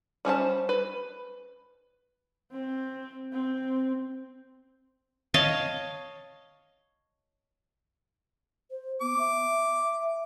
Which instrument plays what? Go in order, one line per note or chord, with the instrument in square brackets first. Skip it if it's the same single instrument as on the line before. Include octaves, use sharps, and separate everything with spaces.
[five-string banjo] G3 C#4 C5 A5
B4
[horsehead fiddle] C4
C4
[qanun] C#5 D#5 F5 A5
[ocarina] C5
[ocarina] B3 [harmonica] D6
[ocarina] E5